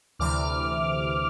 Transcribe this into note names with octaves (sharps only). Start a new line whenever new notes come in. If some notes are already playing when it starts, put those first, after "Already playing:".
D2 C3 E3 D6 F6